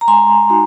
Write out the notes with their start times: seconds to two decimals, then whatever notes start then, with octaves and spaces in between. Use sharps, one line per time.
0.01 A#5
0.08 G#3 G#5 C6
0.50 D#4 F#4